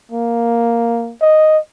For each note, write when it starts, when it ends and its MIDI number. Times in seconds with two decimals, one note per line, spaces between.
0.11 1.14 58
1.21 1.58 75